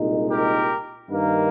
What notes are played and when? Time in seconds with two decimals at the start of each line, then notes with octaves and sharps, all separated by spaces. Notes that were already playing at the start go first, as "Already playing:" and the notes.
Already playing: C2 A#2 G#3 D#4
0.31 G4 A#4
1.09 G2 D#3 A#3